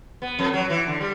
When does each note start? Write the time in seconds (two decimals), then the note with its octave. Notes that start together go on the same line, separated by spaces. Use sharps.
0.22 B3
0.39 F2
0.54 F#3
0.70 E3
0.87 D3
1.01 G3